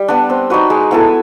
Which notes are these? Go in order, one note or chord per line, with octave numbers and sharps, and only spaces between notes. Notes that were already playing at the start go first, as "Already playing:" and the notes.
Already playing: G3
B3 D4
C4
D#4 F#4 B4
G#3
B3 E4 A4